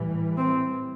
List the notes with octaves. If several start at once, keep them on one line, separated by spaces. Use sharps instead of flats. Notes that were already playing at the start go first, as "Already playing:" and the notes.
Already playing: A2 E3 G3
C4